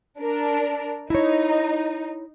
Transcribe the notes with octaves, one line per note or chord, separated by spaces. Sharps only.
D4 A#4
D#4 E4 C#5